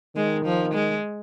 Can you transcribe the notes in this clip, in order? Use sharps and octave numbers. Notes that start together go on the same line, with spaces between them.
D#3 G#3
F3
G#3